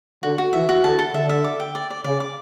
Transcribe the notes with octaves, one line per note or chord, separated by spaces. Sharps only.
D3 F#4
F#4
E3 E5
F#4
D3 A5
A4
D3 E5
E5
D6
G5
D5
D5
C#3 D5
D6